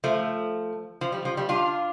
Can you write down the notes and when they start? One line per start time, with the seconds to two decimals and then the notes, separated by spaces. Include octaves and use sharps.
0.04 F3 A3
1.01 F3
1.12 G3
1.25 F3
1.37 G3
1.49 D4 F4